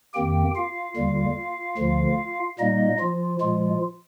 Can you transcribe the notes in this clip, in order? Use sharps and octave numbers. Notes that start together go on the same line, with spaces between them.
F2 D#3 A#3 G4 G5
F4 F5
D#2 D3 G3
D2 D3 F3
A#2 G3 A#3 D#4 D#5
F3 F4
A#2 F3 G#3 F4